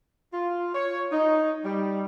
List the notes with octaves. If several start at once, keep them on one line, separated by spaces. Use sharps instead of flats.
F4
C#5
D#4
G3